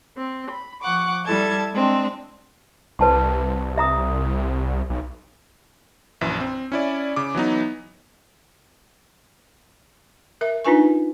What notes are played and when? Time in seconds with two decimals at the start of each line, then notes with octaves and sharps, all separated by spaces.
0.17 C4
0.51 B5
0.83 F3 F#5 C#6 D6
1.26 G3 E4 A4 A5 G#6
1.72 G#3 C4 D4
2.99 C2 B4 A5 C6
3.77 E5 A#5 D#6
4.90 B1
6.21 A#1 F#2 E3
6.40 C4
6.72 C#4 E4 D5
7.16 C#3 D6
7.35 E3 F#3 B3 D#4
10.41 A#4 E5
10.65 D4 D#4 F4 B4 G#5 C#6